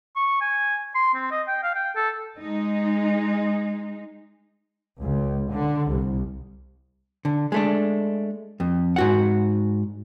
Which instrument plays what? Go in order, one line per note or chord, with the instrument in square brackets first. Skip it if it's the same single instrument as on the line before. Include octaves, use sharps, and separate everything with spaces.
[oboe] C#6
G#5
C6
C4
D#5
G5
F5
G5
A4
[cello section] G#3 D#4
[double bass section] C#2
D3
C2
[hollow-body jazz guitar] D3
G#3 A3 D4
F2
G#2 F#4 F#5